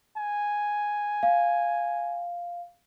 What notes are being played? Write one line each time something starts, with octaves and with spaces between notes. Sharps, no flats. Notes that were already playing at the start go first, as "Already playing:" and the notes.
G#5
F5